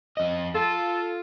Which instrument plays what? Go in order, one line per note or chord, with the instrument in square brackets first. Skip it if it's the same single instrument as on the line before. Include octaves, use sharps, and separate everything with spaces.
[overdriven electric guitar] F2 D#5
[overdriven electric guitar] F4 [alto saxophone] A4